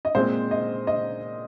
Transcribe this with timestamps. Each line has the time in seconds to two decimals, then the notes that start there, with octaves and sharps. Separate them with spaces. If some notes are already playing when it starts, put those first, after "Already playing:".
0.05 D#5
0.15 A#2 G#3 C4 C5
0.51 D#5
0.87 D#5